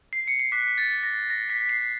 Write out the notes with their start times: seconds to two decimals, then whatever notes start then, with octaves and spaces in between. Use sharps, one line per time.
0.13 C7
0.27 C#7
0.40 C7
0.52 D6 F#6 B6
0.78 A6
1.03 A#6
1.30 A#6
1.49 B6
1.69 C7